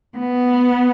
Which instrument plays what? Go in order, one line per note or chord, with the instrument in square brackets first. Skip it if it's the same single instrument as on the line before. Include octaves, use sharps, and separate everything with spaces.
[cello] B3